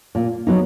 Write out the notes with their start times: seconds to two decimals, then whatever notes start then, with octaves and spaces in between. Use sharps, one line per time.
0.15 A#2
0.47 F#3 B3 D#4